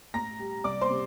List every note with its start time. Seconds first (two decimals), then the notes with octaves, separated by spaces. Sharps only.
0.14 A2 A#5 A#6
0.39 G3
0.64 C2 D5 D6
0.81 C5 C6
0.90 C3